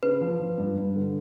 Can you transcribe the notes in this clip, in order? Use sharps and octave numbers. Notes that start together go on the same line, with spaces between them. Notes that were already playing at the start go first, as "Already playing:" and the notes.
C#3 B4
F3
F3
G2
G2
D3